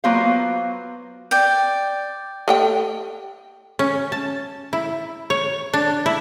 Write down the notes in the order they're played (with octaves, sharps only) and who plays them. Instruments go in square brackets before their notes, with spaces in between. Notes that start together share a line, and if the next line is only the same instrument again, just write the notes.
[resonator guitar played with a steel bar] F#3 A#3 B3 F4 C5 F5
[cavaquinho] D5 G5
[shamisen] A3 G4 G5
[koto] C#4
A5
E4
C#5
D4
E4